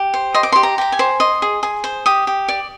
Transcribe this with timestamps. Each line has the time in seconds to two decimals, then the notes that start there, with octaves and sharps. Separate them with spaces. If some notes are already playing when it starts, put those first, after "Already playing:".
Already playing: G4
0.14 C5
0.34 D#5 C6
0.43 D6
0.52 G4 C6
0.63 A#5
0.78 G4 A#5
0.92 G#5
0.99 C5
1.20 D#5 C6
1.42 G#4
1.63 G#4
1.84 C5
2.06 G4 D#6
2.27 G4
2.49 D5